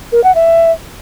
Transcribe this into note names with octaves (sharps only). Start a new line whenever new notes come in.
A#4
F#5
E5